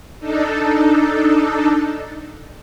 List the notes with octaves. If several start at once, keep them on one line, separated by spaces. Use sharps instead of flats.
D4 D#4 A4